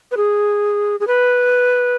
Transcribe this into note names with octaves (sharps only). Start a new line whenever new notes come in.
B4
G#4
G#4
B4